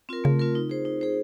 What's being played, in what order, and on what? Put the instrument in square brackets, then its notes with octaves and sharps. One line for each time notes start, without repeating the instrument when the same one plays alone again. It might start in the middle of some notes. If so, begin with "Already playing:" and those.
[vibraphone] C4 F4 A#4
[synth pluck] C#3 [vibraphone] A3
[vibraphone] C4 F4 A#4
D#4
G#4 C5
D#4
G#4 C5